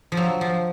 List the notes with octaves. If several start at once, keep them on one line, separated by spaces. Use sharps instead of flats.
F3
F#3
F3